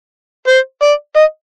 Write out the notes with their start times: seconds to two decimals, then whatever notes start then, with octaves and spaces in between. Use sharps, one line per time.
0.47 C5
0.82 D5
1.16 D#5